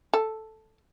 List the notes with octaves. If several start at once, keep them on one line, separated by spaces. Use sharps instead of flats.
A4